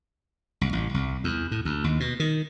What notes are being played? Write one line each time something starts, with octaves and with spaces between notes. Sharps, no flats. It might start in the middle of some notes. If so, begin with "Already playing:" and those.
C2
A1
C2
E2
A2
D2
D#2
B2
D#3